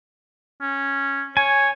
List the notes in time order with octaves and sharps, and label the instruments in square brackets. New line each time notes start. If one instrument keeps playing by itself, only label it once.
[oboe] C#4
[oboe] C#5 [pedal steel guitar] G#5